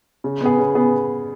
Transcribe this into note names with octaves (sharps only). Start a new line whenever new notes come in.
C#3
B3 G#4
C#3
B3 G#4